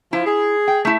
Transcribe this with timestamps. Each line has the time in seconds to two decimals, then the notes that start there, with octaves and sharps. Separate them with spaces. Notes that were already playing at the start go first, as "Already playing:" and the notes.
0.13 F3 E4
0.26 G#4
0.68 G5
0.85 A3 E4